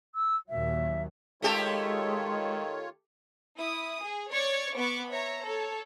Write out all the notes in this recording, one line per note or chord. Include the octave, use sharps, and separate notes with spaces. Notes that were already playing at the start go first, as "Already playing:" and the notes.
E6
D#2 A#2 F#3 E5
D#3 G#3 A3 F4 G4 A4 C#5
E4 D#6
G#4
C#5 D5 C#6 G#6
B3 B5 C#6 D6
C#5 E5 A#5
A4 C#5